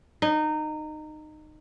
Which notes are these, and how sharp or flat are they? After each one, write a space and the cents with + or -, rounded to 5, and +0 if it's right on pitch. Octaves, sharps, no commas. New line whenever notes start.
D#4 -20